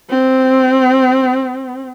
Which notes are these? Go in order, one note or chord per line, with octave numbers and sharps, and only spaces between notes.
C4